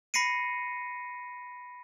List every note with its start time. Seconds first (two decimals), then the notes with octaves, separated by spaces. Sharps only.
0.14 B5 A#6 C7 C#7 D#7